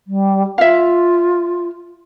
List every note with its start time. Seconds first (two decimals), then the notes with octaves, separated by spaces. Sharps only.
0.07 G3
0.58 F4 E5 F5